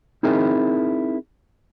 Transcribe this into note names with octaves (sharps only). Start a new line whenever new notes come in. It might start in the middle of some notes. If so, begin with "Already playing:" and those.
C4 D#4 E4 G#4 A#4 G5